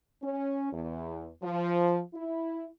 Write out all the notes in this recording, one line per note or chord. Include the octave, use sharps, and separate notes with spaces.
C#4
E2
F3
E4